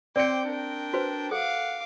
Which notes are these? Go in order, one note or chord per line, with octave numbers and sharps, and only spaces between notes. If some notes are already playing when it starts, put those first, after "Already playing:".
C4 C5 D5 G5 D6 C#7
D4 A#4 G5
F#4 B4 C5
A4 F5 F#5 D6